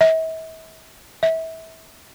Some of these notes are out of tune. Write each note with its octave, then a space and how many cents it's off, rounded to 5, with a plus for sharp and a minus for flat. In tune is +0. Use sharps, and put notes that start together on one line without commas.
E5 -40
E5 -25